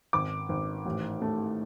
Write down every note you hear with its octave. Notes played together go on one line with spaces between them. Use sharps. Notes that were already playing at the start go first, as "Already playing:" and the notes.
G#1 D6
G#1
A1
A3